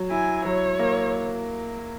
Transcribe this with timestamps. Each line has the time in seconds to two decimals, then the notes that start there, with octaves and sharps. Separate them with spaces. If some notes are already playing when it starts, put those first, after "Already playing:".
Already playing: F#3
0.10 E4 G#5
0.45 F#3 C#5
0.79 A#3